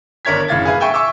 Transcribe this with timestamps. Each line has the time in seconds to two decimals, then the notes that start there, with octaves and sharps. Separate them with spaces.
0.25 G1 D4 A#4 C#5 G#6 B6
0.48 F#1 A2 F5 G#6 A6
0.65 G#4 B4 F5 G#5
0.80 E5 G5 G#5 C#6
0.94 E5 C#6 D6 E6